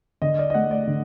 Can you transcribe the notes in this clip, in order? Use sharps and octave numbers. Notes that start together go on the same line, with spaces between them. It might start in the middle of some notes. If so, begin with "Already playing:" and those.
D3 D#5
D5
D#5
A3 F#5
D5
D3